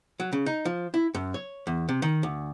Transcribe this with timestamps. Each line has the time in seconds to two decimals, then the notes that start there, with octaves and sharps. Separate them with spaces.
0.20 F#3
0.33 C#3
0.46 D#4
0.65 F3
0.94 E4
1.15 F#2
1.34 C#5
1.67 E2
1.89 C3
2.02 D#3
2.23 D2